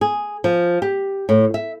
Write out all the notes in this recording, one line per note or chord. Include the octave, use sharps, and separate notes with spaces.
G#4
F3
G4
A2
E5